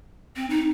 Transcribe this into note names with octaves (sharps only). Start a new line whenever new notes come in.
C4
D#4